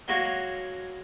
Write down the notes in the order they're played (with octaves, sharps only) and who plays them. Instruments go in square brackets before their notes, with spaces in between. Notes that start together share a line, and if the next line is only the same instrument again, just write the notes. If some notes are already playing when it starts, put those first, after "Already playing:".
[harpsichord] F#3 G#3 A#3 F#4